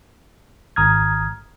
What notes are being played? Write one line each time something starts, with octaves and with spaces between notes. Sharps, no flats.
G#1 A#5 D#6 F6 G#6